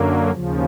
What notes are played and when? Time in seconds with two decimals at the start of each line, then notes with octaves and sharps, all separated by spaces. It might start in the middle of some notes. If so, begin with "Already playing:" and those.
Already playing: F#2 D3 F#3 A#3
0.30 D#2 C#3 F3